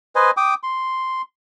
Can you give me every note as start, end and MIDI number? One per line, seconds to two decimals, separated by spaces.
0.15 0.31 71
0.15 0.31 72
0.15 0.31 75
0.15 0.31 80
0.37 0.54 79
0.37 0.54 86
0.37 0.54 87
0.63 1.22 84